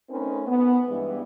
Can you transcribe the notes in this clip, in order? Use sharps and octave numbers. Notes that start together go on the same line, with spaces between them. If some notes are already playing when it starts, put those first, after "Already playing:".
A3 C4 C#4 D#4 A#4 B4
B3
G2 E3 G#3